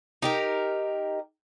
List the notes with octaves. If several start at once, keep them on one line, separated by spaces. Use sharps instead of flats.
D#4 G4 A#4